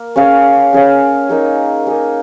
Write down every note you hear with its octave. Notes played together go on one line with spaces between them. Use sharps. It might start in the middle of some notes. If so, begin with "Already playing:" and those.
Already playing: A#3
C#4 G#4 C#5 F5
C#4 G#4 C#5 F5
A#3 D#4 G#4
A#3 D#4 G#4